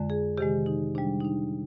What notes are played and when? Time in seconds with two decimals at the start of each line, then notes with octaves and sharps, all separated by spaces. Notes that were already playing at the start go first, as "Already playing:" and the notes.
Already playing: F2 D3 G#3
0.10 G#4
0.38 C3 D#3 G#3 G4
0.66 D#4
0.95 C3 G3 D4
1.20 D#4
1.24 D4